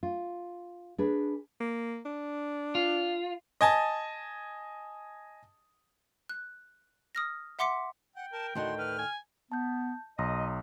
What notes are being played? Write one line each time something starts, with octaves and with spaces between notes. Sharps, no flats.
F4
D4 G#4 B4
A#3
D4
F4
D#5 G#5 A5
F#6
D#6 F6 A#6
E5 F#5 C6 D6 B6 C#7
F#5 G5
A#4 A5
D2 A2 D#3 F#4 C6
B4 F6
G#5
B3 A5 G6
B1 D#5 A#5 C6 D#6